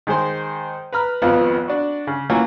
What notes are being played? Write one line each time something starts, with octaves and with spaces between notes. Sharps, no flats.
D#3 G#3 G#4 C5 C6
B4 A#5 B5 F6
G#1 F2 F3 B3 F4 F5
D4 F#4
C#3
E3 F#3 A#3 C#4 F4 F#4